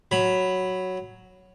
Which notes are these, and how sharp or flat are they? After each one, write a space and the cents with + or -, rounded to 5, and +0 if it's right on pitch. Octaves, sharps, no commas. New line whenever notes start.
F#3 +0 B5 +0